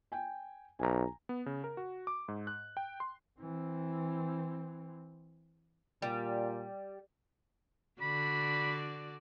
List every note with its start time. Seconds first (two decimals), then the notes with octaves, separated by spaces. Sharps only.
0.12 G5 G#5
0.79 B1 G#5 A#5
1.29 B3
1.46 C#3
1.64 A#4
1.77 F#4
2.07 D6
2.28 G#2
2.47 F#6
2.77 G5
3.00 C6
3.40 E3 C4
6.02 A#2 G3
8.02 D3 F#4 D5 B5